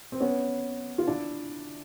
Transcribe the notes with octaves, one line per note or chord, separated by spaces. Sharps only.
C4
B3 C#4
F4
D4 E4